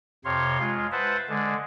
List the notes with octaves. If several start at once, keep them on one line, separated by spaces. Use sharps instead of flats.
F2 C3 C#5 F5 C6
G#3 F4
B4 C5 E5 F#5 A5
D3 G#3